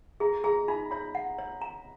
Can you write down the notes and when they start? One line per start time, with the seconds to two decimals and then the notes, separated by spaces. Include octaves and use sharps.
0.20 G#4 A#5
0.44 G#4 A#5
0.68 D#4 B5
0.91 C#5 B5
1.15 F#5
1.38 C#5
1.62 A#5